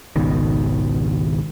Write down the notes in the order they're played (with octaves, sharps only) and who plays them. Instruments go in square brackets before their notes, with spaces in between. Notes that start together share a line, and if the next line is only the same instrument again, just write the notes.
[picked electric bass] G#1 C#2 B2 D#3